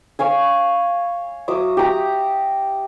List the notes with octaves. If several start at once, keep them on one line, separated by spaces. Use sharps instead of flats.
C#5 F5 G#5
F#3 E5 D6 D#6
G4 A#5